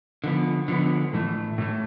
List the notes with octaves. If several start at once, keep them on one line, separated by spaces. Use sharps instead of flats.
D3 F3 B3
D3 F3 B3
A2 E3 A3
A2 E3 A3